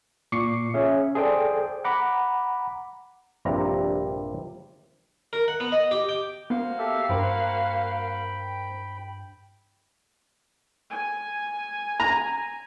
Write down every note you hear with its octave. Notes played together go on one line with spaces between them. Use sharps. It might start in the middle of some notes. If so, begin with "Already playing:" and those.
A#2 C#6 D6 C7 C#7
C#4 G#4 E5
G#4 A4 C5 D5 G5
F#5 A#5 B5 D6
A#1 G2 C3 G3 A#5
A#4
F#5
B3
D#5
G4
G5
A#3 B3 F#4 C5 F5
G4 A4 E5
G2 A#4 C5 G5 A#5 B5
G#5
A#5